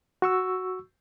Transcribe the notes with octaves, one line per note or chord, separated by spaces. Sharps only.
F#4 C#6 E6